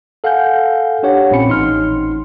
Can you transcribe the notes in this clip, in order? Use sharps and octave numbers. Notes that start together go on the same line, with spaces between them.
A4 F5 F#5 G#5 G6
D4 G4 C#5 F#5
A#1 A#2 C4 C#4 B5 C#7
A1 D#4 C6 F6